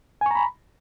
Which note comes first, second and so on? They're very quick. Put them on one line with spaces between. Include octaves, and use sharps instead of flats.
G#5 C#6 A#5 B5